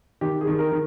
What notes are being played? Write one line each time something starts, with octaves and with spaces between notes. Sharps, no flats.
D#3 G4
G#4
D#3
A#4
D#3